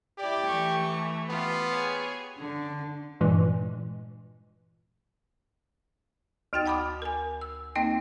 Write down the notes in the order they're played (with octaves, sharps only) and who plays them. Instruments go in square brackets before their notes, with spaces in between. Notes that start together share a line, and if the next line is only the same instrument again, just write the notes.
[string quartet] E4 D5 [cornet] G4
[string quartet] E3 A3 [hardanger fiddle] C#6
[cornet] B3 [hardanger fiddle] F4 G4
[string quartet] G#4 C#5
[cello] D3
[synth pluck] G2 A#2 E3 G#3
[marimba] D2 D#4 F#4 G5 A6
F#5 A5 B5 D6 D#6
A#4 G#5
E6
A#3 C4 D#4 D#5 G5